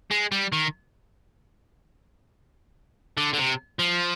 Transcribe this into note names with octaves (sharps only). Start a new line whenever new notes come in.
G#3
G3
D#3
D3
D3
C3
F3